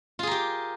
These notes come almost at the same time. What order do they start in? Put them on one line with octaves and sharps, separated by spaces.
F4 G#4 A#4 G4